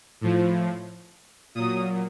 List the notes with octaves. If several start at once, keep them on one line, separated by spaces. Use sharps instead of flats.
A2 F3
A#2 F#3 D#6